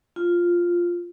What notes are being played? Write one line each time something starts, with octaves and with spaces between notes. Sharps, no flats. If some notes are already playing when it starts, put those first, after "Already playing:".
F4